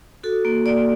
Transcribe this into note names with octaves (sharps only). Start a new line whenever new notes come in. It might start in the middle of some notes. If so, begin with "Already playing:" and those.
F#4 A4
A#3
A#3 D5